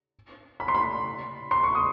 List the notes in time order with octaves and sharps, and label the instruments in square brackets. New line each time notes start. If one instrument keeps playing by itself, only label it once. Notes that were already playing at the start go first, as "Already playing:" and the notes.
[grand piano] B5
C6
B5
C6
C#6
D#6